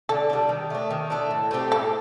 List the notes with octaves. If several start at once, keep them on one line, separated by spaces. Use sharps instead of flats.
D3 A4
G3 D4
D#3
A3 D4
D#3
A3 D4
A2
A3 C4 G4
A2 A4